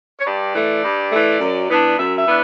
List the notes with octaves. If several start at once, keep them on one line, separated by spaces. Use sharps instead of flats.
C#5
G2 D5
E3 A3
G2
E3 A3
F#2
E3 B3 D4
F#2 E5
E5
E3 B3 D4